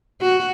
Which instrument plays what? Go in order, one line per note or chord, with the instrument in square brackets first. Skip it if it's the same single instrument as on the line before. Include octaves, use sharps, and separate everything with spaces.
[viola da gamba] F#4